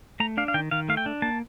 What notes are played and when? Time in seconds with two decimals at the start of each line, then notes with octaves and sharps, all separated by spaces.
0.20 A3 A#5
0.37 D4 F5
0.48 F5
0.54 D#3 G5
0.71 D#3 F5
0.89 A3 F5
0.97 G5
1.06 D4
1.22 A#3 A5